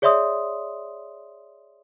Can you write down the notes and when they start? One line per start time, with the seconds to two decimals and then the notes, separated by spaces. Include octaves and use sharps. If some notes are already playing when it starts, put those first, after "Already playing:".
0.02 G#4 C#5 D5 E5 C6 D#6